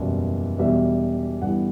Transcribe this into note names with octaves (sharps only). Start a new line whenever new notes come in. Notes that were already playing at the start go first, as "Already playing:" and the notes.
Already playing: F#1 E2 B2 G3 B3
E1 E2 B2 G3 B3 E5
G1 G2 E3 G3 B3 F#5